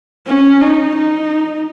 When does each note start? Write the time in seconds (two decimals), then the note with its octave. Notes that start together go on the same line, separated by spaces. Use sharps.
0.27 C#4
0.61 D#4
0.95 D#4